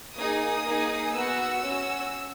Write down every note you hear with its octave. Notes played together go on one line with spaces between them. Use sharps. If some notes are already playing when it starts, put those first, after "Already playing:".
A#3 D#4 G#4 D#6
A#3 D#4 G#4
B3 F#4 E6
C#4 F#4